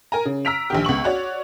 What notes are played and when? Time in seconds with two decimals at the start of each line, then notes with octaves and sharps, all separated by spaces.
0.12 A#4 G#5 A#5
0.25 C#3
0.45 A#5 E6 F6 B6 D7 F7
0.70 A#1 D#3 G4
0.85 C#2 B3 C#6 F#7
1.04 F#4 C#5 D5